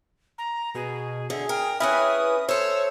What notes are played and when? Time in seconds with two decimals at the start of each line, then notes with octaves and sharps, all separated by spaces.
0.38 A#5
0.75 B2 G#4
1.30 D3 G#4 E5
1.49 A#4 G5
1.80 C#4 E4 G#4 B4 E5 D#6 F6
2.49 A4 C5 C#5 E6